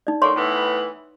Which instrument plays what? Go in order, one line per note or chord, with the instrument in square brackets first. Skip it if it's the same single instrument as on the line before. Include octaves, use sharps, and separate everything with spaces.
[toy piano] D#4 D5
[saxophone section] A2 D3 A#3 [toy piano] C#5 C6 C#6
[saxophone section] A2 E3 B3